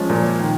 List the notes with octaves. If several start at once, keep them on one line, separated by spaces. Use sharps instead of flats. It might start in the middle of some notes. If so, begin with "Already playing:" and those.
Already playing: F3 G#3 C#4 F4
A#2
D#3